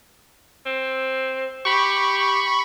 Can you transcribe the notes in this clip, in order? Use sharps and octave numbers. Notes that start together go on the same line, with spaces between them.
C4
G4 B5 C#6